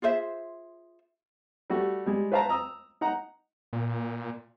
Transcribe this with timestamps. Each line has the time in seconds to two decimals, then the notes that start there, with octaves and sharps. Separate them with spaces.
0.02 F4 G#4 C5 E5
1.70 G3 A3 F#4
2.06 G3 G#3
2.32 B4 C5 F5 A5 A#5
2.49 A#5 D#6 E6
3.01 D#4 F#5 A#5
3.73 A#2